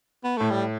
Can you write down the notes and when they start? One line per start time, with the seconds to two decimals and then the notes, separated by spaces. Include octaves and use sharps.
0.24 B3
0.37 A2 A3
0.50 G3